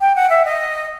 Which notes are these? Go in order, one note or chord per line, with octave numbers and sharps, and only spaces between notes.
G5
F#5
E5
D#5